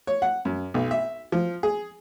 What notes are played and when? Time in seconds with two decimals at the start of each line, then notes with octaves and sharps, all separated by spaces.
0.07 C#5
0.22 F#5
0.45 F#2
0.74 B1
0.91 E5
1.32 F3
1.63 G#4